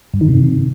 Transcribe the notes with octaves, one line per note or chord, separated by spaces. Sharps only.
G2
D#3
C3